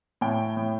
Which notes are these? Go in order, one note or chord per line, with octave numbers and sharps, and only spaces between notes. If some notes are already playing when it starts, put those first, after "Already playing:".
A2 G5
A2